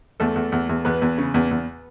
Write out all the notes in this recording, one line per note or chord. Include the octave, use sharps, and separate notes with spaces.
E2 A3 A4
E2
E2
E2
E2 B3 B4
E2
C#3
E2
E2